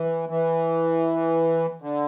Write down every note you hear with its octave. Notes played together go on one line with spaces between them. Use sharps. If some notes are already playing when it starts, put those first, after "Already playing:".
Already playing: E3
E3
D3